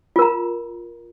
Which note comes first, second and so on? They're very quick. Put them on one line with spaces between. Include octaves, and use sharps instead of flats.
F4 A#4 A#5